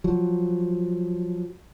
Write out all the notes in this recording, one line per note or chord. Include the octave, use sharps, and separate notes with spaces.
F3 F#3